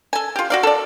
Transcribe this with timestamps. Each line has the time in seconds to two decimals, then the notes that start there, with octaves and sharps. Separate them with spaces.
0.13 A4 G#5
0.36 F4 G4
0.50 F#4 D5 F5
0.63 A4 D5